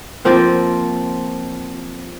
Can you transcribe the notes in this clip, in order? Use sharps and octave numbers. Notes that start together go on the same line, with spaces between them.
F3 A#3 C4 F4